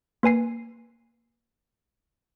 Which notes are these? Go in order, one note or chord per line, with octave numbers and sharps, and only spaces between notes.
A#3 B4 G#5 C7